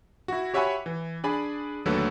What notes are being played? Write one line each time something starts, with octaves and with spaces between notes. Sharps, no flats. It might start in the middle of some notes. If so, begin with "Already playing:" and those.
E4 F#4
G4 C#5 E5 F#5 G#5 B5
E3
D4 G#4 D5 G#5 B5
D#2 D3 F#3 A3 A4 B4